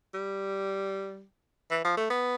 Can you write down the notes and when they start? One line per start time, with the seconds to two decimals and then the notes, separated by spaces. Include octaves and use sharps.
0.14 G3
1.71 E3
1.84 F3
1.97 A3
2.10 B3